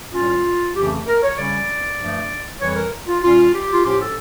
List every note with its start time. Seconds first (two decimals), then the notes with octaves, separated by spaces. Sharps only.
0.13 A2 G3 C#4 F4
0.76 F2 C#3 E3 A3 C#4 G4
1.07 A#4
1.23 C#5
1.38 C#3 G3 C#4 D5
1.99 G2 F3 A3
2.60 F2 E3 G3 C#5
2.76 A#4
3.07 F4
3.23 A#2 G3 C#4 F4
3.53 G4
3.73 F4
3.84 A2 F3 C#4 G4
4.00 A4